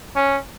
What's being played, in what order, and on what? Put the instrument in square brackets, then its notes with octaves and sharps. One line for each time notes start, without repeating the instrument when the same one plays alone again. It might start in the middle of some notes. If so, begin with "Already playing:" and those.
[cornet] C#4